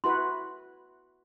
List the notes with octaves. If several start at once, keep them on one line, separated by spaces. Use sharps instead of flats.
E4 F#4 B4 C6